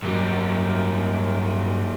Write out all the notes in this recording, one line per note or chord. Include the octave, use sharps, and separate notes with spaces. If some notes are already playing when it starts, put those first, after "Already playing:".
G2 A#2 F#3 G3